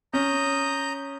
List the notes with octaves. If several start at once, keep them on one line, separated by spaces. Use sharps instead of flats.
C#4 A#5 D#6 G6